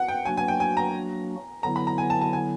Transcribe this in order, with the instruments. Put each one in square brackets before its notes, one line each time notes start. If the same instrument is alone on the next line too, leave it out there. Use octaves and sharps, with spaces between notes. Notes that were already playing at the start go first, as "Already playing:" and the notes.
Already playing: [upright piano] F#5
G5
[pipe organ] F#3 A#3 D4 F#4 [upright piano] G#5
[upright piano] G#5
G5
G#5
A#5
[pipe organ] D3 F#3 B3 E4 [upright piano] A#5
[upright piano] B5
A#5
G#5
A5
A5
G#5